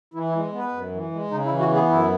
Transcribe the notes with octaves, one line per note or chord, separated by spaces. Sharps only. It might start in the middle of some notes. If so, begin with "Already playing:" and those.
E3 E4
E4
G#3
B3
B4
F#2
E3
G#3
C#3 D#4
E4
E3
F#4
B3
G#4
F#2 E4